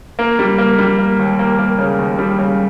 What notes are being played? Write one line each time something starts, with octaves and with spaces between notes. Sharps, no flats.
A#3
G3
A#3
G3
A#3
D#2
A#3
A#3
C#3
D#2
G3
C#3